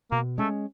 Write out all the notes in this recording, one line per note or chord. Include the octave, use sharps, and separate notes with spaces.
B2 A#3
G#3 A3 C#4